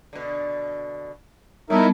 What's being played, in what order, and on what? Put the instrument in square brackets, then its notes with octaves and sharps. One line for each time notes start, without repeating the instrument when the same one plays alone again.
[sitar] B2 D3
[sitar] F#3 A3 [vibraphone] G3 B3 A5 [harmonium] D#4 E4 A#4